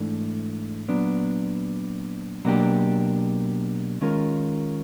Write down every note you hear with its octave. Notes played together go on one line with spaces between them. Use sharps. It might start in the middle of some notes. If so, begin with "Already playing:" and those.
Already playing: G#2 E3 A3 D4
A#2 F#3 B3 D4
B2 F#3 A#3 D4 G4
D#3 G#3 C#4 F4 A#4